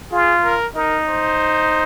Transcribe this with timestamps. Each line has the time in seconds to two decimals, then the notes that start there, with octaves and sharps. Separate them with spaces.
0.12 F4 G#4
0.44 A#4
0.76 D#4 A#4
1.08 C5